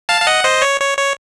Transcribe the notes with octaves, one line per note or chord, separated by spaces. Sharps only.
F5 A5
F5
D#5 F#5
C5 D#5
C#5
C#5
C#5